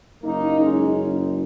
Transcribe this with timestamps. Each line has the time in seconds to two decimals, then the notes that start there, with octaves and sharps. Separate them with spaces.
0.23 F#1 F#2 F#3 A#3 D#4
0.60 G#3 C#4